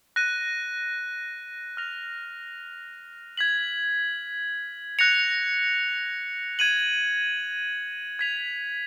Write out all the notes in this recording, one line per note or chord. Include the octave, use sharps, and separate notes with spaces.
F#6 A#6 D#7
F6 A#6 F7
G#6 B6 F#7
F#6 A#6 C#7 F7
G#6 D#7 F#7
G#6 B6 F7